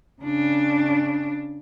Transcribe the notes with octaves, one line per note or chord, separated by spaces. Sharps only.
C#3 D4